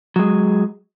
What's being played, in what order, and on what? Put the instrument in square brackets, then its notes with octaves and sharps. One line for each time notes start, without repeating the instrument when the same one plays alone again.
[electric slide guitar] F#3 G#3